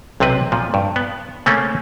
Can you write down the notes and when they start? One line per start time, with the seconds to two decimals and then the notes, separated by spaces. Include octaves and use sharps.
0.20 B1 C3 C4 B4
0.52 A#2 F3
0.74 G2
0.96 B3
1.46 C#3 A3 A#3 C4 C#4